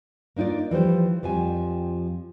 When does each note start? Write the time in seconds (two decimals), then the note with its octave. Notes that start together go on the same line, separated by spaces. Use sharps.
0.36 A#3 D4 D#4 F4 D5
0.71 E3 F3 G3 C5
1.23 F2 F3 G3 G#5